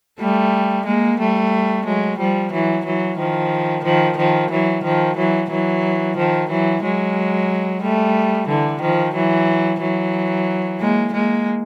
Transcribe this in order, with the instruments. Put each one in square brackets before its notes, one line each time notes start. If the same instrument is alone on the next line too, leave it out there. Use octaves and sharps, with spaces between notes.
[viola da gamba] G3 A3
G#3 A#3
G3 A3
F#3 G#3
F3 G3
E3 F#3
E3 F#3
D#3 F3
D#3 F3
D#3 F3
E3 F#3
D#3 F3
E3 F#3
E3 F#3
D#3 F3
E3 F#3
F#3 G#3
G3 A3
D3 E3
D#3 F3
E3 F#3
E3 F#3
G#3 A#3
G#3 A#3